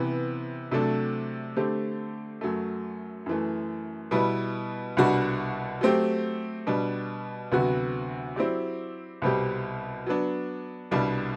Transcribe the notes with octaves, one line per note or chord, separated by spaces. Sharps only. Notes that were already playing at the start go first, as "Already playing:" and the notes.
Already playing: C3 E3 B3
C3 F#3 A3 D4 A4
D3 A3 C4 G4
F#2 F#3 A3
F#2 E3 A3
B2 G3 B3 E4
C2 B2 G3 D4 F#4
F#3 A3 C4 G4
B2 G3 D4
D2 C3 F#3 B3 F#4
F#3 C4 E4 G4 D5
C2 B2 G3 C4 G4
F#3 B3 D4
C2 B2 G3 D4